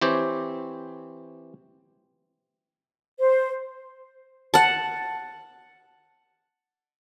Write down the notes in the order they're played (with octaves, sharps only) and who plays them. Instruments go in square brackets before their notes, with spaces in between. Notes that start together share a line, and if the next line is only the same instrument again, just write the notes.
[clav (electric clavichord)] E3 C4 G4 C5 C#5
[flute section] C5
[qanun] F#5 A5